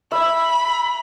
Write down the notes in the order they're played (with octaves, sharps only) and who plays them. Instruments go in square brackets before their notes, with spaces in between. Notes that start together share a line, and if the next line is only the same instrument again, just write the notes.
[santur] E5 [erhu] B5